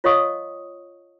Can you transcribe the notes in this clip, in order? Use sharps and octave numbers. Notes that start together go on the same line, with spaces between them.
F4 C#5 D#5 F5 C#6 D#6